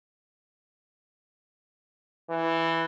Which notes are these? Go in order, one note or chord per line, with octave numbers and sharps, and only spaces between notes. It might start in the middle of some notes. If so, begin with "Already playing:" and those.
E3